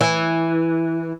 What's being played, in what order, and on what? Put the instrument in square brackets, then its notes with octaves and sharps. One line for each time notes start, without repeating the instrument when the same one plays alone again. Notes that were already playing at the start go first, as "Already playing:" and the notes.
[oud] E3